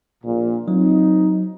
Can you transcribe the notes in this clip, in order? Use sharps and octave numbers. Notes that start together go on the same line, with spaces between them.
A#1 A#2
F#3 C4 D#4